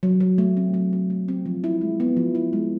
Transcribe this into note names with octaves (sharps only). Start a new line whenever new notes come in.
F#3
F#3
A3
C4
F#3
F#3
A3
C4
F3
E4
G#3
B3
F3
E4
G#3